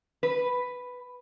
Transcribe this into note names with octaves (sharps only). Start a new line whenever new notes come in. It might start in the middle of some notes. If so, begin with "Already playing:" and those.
B4